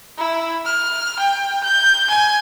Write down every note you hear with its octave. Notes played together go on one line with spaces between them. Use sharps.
E4
F6
G5
G6
G#5